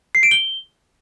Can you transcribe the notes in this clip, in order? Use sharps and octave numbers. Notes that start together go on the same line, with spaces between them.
C7
D7
G7